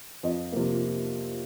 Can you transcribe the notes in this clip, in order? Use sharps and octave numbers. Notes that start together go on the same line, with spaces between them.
F2 D#5
C3 F3 A#3